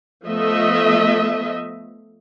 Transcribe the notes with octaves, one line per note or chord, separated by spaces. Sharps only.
F3 A3 B3 D#5 E5